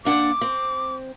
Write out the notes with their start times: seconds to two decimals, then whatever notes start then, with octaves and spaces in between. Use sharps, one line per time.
0.05 A#3 D4 F#5 D6
0.41 C4